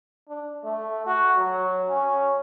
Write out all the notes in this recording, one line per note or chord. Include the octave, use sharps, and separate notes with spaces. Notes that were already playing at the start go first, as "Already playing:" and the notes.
D4
A3
F#4
F#3
C#4